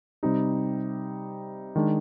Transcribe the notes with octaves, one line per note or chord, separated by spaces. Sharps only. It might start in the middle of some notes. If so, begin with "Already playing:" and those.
C3 G3 C4 D#4 G4
D#3 G#3 D4